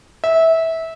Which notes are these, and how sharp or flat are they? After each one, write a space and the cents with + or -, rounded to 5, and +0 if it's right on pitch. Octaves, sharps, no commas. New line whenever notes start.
E5 -20